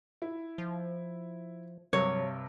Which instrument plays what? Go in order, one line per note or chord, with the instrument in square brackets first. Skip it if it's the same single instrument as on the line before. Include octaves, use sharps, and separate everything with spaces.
[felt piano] E4
[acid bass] F3
[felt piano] G2 C3 [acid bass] F#3 [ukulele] C#5